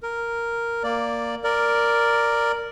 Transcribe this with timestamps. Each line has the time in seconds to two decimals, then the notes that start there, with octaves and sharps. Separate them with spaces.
0.03 A#4
0.83 A#3 D5
1.44 A#4 D5